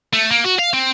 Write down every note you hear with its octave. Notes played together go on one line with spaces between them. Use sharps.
A3
A#3
F#4
F5
C4